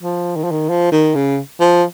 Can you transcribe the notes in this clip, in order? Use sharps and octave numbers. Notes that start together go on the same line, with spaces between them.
F3
D#3
F3
D#3
F3
D#3
C#3
F3